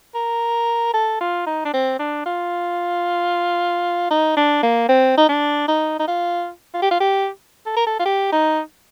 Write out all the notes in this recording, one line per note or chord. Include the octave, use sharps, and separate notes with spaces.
A#4
A4
F4
D#4
D4
C4
D4
F4
D#4
D4
A#3
C4
D#4
D4
D#4
D#4
F4
F4
G4
F4
G4
A4
A#4
A4
F4
G4
D#4